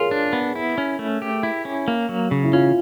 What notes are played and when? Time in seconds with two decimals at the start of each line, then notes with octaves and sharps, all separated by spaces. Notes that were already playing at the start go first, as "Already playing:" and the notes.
Already playing: F4 G#4 A#4 C#5
0.11 D4
0.33 B3
0.55 E4
0.78 C#4
0.99 A3
1.22 G4
1.43 E4
1.65 C#4
1.88 A#3
2.09 F#3
2.31 C#3
2.44 E4
2.53 C#4 F4